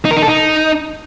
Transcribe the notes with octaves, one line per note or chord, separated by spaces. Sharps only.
D#4
A#4
D#4
A4
D#4